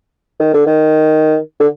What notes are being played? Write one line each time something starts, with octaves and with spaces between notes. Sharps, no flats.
D#3
D3
D#3
D3